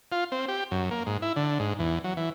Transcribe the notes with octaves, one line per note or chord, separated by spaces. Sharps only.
F4
C4
G4
F#2
A#3
G#2
E4
D3
G#2
E2
F#3
E3